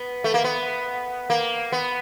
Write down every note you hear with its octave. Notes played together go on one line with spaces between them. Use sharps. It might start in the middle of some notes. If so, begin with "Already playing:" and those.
Already playing: B3
A3
A#3
B3
A#3
B3